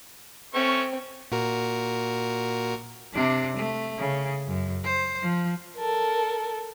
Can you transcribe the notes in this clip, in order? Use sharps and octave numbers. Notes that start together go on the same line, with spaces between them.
A3 C4 C#4 C#6
A#2 F#4 A#4
C3 D4
A3
C#3
F#2
C5
F3
A4 A#4